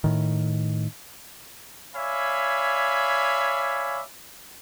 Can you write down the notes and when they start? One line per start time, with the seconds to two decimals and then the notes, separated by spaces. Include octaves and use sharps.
0.04 A2 D#3
1.95 C#5 D5 E5 F5 G#5 B5